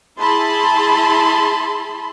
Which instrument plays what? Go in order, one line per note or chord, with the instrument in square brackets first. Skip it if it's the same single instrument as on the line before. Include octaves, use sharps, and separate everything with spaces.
[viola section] E4 G#4 A5 B5 C6